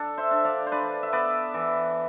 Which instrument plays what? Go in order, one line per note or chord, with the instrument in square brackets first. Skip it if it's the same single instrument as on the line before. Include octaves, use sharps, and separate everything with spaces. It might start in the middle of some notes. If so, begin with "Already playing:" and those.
Already playing: [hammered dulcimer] D4 A4
C5 E5
D4
D5 F5
C5
D4 B4 D5
E5
B3 B4 D5
E3